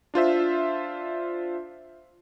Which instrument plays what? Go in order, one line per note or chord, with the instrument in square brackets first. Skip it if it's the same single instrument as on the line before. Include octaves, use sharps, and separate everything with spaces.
[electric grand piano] D4 F4 C5 E5